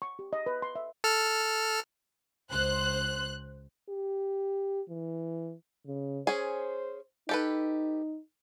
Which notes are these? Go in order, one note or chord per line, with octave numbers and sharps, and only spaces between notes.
C#6
G4
D#5
B4
C6
E5
A4 F6
C#2 C5 F#6
G4
E3
C#3
C#4 G#4 C5
D#4 G4 A4 B4